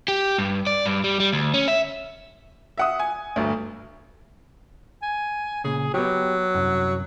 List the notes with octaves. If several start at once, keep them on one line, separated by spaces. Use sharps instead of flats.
G4
G2
D5
G2
G3
G3
D2
C#4
E5
E5 F#5 D#6
G#5
G1 D2
G#5
A#2 C#3 G#4
F#3 B3 G4
C2 F#2